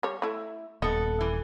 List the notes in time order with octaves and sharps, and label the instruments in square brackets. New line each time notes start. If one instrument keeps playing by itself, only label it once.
[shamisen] G3 C#5
A3 E4
[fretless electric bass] D#1 [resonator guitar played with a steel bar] B3 A4 [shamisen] D#5
[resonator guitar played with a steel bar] E3